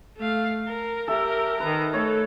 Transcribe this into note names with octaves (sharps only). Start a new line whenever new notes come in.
A3 F5
A#4
G4 A4 A#4 E5
D#3 B4 A#5
A3 A4 C#5